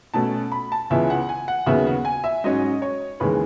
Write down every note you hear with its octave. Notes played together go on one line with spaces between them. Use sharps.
B2 A3 C#4 A5
B5
A5
C#2 C#3 E3 B3 E5
F#5
G#5
F#5
D#2 C#3 F#3 B3 E5
F#5
G#5
E5
G#2 F#3 C#4 D#5
C#5
D#2 C#3 E3 G#3 B4